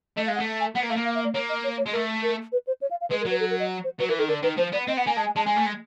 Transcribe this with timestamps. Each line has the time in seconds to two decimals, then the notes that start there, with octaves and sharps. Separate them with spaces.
0.17 A3 D#5
0.26 G#3 F5
0.36 F#5
0.40 A3
0.60 G#5
0.75 B3 F#5
0.83 A#3
0.90 A3 F5
0.96 A#3
1.05 F5
1.15 E5
1.24 D5
1.34 A#3 C#5
1.49 D#5
1.64 C#5
1.78 C#5
1.86 G#3
1.93 A3 A#4
2.23 A#4
2.52 B4
2.67 C5
2.81 C#5
2.91 F5
3.01 F5
3.10 G#3 B4
3.21 A#4
3.25 F#3
3.30 B4
3.40 A4
3.50 A#4
3.60 D#5
3.84 C5
3.99 F#3 B4
4.09 E3 A#4
4.19 D#3 A4
4.28 D3 A#4
4.43 D#3 B4
4.57 F3 C5
4.72 B3 D5
4.87 C4 D#5
4.97 B3 F#5
5.07 A#3 G#5
5.16 G#3 A5
5.26 G#5
5.36 G#3 A5
5.46 G#3 G#5
5.56 A3
5.66 G#3